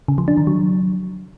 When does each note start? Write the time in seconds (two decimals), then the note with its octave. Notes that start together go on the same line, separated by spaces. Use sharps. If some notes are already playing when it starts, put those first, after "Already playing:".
0.08 C#3
0.18 F3
0.28 D4
0.37 D#3
0.47 F#3